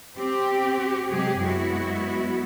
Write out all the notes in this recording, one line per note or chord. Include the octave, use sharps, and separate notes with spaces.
C4 G4
C3 F#3 G#3 G4 G#4
F#2 G#3 B3 E4 F#4